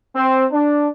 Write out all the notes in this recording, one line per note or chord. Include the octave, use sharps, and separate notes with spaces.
C4
D4